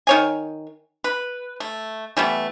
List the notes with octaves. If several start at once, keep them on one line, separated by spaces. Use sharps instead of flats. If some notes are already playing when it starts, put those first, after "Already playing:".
D#3 C#5 G#5
B4
A3
E3 G3 A3 B3